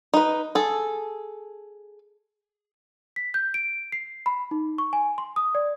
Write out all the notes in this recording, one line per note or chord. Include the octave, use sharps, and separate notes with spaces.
D#4 B4
G#4 A4
B6
G6
D7
C7
B5
D#4
C#6
G#5
C6
D#6
D5